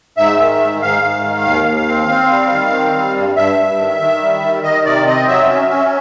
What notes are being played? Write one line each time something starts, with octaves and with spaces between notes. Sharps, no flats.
G#2 E5
D#3
G#2
G#2 F5
G#2
D#3
D#2
D#2
C4
C4
G3
D#3
C4
G3
G2
G2 E5
G2
D#3
D#3
G3
D#3
D#3 D#5
C3 D5
C4 D#5
F#3 E5
C#4
C#4